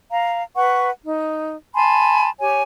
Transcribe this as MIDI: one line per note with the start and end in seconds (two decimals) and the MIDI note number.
0.11 0.43 77
0.11 0.43 82
0.56 0.89 71
0.56 0.89 78
0.56 0.89 85
1.03 1.54 63
1.75 2.30 80
1.75 2.30 81
1.75 2.30 83
1.75 2.30 84
2.40 2.62 67
2.40 2.62 73
2.40 2.62 80